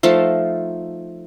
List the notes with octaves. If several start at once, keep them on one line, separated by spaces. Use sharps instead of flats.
F3 A3 D#4 F5